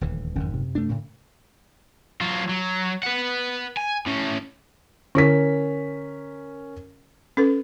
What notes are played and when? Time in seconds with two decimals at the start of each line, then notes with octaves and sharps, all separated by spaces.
0.01 D#1 D2 E3
0.35 F#1 F2 G#2 D#3 C#4
0.53 F#2 C3
0.75 A3 D4
0.89 A2 C#3
2.21 F#3 F4
2.49 F#3
3.03 B4 F#5
3.77 G#5
4.06 A2 C#4
5.15 D3 C#4 E4 A#4 B6
7.37 C#4 A4 B4